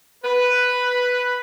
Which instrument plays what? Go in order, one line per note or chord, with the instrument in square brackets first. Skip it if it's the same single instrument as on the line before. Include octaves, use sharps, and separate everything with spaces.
[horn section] B4